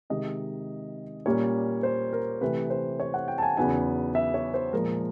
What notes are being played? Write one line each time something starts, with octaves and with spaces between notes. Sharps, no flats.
C3 D#3 G#3 D#5
A#2 G3 A#3 C#4 F4 C#5
C5
A#4
C3 E3 A3 B4
C5
C#5
F#5
G5
A5
G#5
E2 C#3 F#3 B3 D#4 G#5
E5
C#5
C5
A#2 F3 G#3 A#4